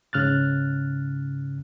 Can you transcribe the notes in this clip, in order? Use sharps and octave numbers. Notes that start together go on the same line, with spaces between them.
G#2 C#3 F6 F#6 A6